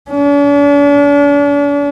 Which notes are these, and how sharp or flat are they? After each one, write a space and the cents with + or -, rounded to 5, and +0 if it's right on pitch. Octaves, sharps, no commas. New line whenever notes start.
D4 -45